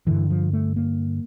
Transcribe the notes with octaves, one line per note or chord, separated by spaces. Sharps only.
G2 D3 E3
F3
A3
A#3